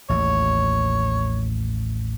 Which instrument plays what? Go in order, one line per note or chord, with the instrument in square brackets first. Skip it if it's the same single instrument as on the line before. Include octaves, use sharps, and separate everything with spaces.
[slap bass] A1 D#2 [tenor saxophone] C#5